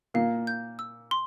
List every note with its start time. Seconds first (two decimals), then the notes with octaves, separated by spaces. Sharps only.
0.14 A#2 A#3 F5
0.47 G6
0.79 E6
1.11 C6